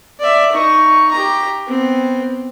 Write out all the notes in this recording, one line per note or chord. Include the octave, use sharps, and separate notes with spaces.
D5 E5
D#4 C#6
G4 A#5
B3 C4